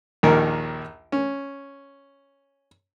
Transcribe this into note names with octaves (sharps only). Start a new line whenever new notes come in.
A#1 D#2 D#3 A#4
C#4